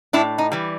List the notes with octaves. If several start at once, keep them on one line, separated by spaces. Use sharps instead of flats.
A2 D4 E4
D#4
E3 G3